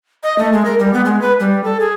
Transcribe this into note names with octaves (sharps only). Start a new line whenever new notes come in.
D#5
A3
G#3
A#4
G3
B3
G#3
B4
G3
A4
G#4